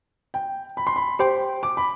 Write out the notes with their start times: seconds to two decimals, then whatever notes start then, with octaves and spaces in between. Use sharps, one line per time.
0.34 G5
0.77 B5
0.87 C6
0.96 B5
1.19 G4 C5 G5 C6
1.63 D6
1.77 B5